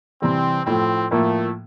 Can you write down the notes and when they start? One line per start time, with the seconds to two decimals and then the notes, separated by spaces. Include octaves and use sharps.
0.22 C3 E3 G3 C4
0.66 A2 F3 A3 C4
1.11 A2 F3 A3 A#3